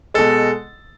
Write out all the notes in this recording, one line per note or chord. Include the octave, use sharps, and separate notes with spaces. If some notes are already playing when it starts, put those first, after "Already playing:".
B2 G#3 A4